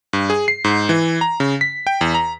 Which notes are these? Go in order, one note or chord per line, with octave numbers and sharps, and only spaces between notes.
G2
G#4
C7
G#2
E3
A#5
C#3
B6
G5
E2
A#5